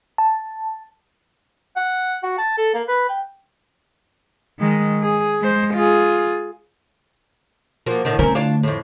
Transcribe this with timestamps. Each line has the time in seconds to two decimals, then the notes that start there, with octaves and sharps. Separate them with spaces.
0.18 A5
1.76 F#5
2.23 F#4
2.38 A5
2.58 A4
2.74 A#3
2.88 B4
3.09 G5
4.59 D#3 G#3
5.03 G#4
5.41 G#3 C5
5.75 F4 G#4
7.86 F3 A#3 F#4
8.05 A2 D3 D#3
8.19 D3 A3 C4 C#4 A#4
8.35 D4 F4 C#5
8.63 F2 A2